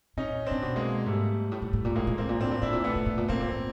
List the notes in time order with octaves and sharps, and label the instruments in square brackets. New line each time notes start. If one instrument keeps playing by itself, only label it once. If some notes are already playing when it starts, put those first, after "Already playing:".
[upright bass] A#2 [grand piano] C#4 D#4
[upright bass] A#2 [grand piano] C4 D4
[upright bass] B2
[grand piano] G#3 A#3
[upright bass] G#2 [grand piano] G3 A3
[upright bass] A2
A#2
A2
A#2
[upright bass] A2 [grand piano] G#3 A#3
[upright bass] A#2
[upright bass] A2 [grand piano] A#3 C4
[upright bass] A#2
[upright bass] A2 [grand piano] C4 D4
[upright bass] A#2
[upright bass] A2 [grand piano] D4 E4
[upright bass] A#2
[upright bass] A2 [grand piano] A3 B3
[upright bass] A#2
A2
A#2
[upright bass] A2 [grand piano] A#3 C4
[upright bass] A#2
A2